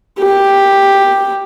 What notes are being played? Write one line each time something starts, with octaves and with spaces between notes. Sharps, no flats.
G4